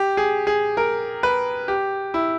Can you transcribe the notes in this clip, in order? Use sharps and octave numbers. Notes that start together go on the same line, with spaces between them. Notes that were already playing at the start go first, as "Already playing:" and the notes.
Already playing: G4
G#4
G#4
A#4
B4
G4
E4